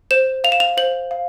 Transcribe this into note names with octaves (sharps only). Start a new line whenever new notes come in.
C5 E7
F5 F7
E7
F7
C5 F#7
F5